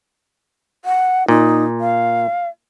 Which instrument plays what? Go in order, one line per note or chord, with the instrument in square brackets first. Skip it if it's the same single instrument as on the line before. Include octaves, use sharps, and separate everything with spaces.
[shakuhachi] F#5
[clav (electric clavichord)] A#2 [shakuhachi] D#4
[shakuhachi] F5